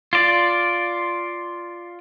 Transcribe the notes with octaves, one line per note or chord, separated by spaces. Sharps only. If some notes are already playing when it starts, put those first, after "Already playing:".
F4 D5